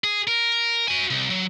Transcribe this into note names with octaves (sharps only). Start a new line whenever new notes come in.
G#4
A#4
F#4 G#5
C2
F#3